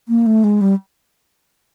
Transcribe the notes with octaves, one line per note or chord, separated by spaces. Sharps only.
A#3
A3
G#3
G3